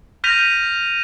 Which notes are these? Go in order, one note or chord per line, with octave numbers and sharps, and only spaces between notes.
F6 G6 A#6 B6 D#7 F7